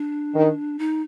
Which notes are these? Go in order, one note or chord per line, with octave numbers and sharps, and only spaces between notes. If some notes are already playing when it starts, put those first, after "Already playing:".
Already playing: D4
D#3
D#4